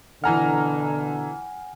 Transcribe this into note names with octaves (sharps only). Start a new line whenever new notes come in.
B2 D3 E3 F#5 G#5 A#5 F6